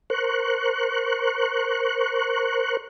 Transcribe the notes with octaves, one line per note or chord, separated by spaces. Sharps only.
A#4 C5 C#6 F#6